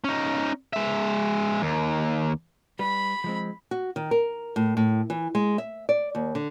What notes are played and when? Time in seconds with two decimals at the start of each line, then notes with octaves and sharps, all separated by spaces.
0.04 C#4 D#4
0.73 G#3 E5
1.62 D#2
2.79 G3 B4 B5
3.24 F3 G#3 C4
3.71 F#4
3.96 D#3
4.11 A#4
4.56 A2
4.77 A2
5.10 E3
5.35 G#3
5.58 E5
5.89 D5
6.15 D#2
6.35 D3